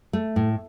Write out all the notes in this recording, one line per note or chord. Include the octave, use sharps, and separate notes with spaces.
A3
A2